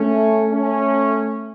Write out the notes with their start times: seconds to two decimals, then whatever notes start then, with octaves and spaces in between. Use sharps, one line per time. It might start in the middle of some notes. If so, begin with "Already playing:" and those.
Already playing: A3 C#4
0.52 A3 C#4